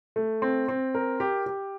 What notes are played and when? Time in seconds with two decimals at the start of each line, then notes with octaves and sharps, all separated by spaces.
0.16 A3
0.42 C4
0.69 C4
0.95 A#4
1.20 G4
1.46 G4